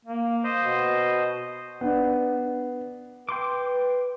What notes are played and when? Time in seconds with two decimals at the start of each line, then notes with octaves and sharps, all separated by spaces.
0.05 A#3
0.44 C5 D#5
0.62 B2
1.81 B3 D4
3.29 B4 G5 C6 D6